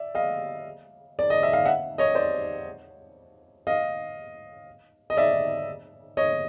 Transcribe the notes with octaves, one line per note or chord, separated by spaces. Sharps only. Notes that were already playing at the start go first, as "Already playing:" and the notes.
Already playing: D5 E5
D#5 F5
D5
D#5
E5
F5
E5 F#5
C#5 D#5
C5 D5
D#5 F5
D#5
D5 E5
C#5 D#5